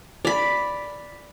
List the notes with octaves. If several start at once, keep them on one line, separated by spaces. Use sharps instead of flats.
D5 B5